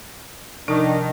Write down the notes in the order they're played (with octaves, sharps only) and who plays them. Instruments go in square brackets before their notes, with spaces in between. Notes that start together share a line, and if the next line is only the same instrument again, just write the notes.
[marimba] C3 F3 D#4 [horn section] D#3 [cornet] D4